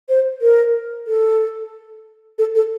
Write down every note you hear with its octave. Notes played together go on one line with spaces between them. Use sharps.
C5
A#4
A4
A4
A4